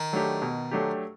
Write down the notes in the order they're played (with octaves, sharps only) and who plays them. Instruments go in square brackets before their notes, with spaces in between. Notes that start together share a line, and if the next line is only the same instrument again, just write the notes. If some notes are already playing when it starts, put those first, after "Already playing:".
Already playing: [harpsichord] D#3
[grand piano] F#3 A3 D4 G4
B2
F#3 A3 D4 G4